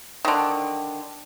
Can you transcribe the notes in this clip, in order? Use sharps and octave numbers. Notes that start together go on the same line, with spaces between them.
D3 D#3